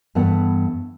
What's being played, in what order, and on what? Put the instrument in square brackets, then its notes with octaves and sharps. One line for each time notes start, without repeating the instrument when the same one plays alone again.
[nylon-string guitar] G2 E3 A3 B3 F#5